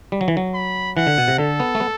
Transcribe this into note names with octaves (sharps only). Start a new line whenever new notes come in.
G3
F#3
E3
F#3
B5
E3 F#5
D3
B2
C3
D3 A4
B3
A3
B3